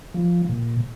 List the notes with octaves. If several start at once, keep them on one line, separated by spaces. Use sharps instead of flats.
F3
A#2